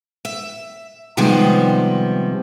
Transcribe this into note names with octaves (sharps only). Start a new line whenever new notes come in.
E5
C3 D#3 F3 G3 G#3 B3